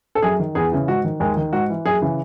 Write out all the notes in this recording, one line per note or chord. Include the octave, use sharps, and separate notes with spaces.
A4
F#2 G#4
D#3
E2 G#4
C#3 E3
G#2 F#4
D#3
D#2 G#3
D#3
G#2 F#4
E3
F#2 G#4
C#3 E3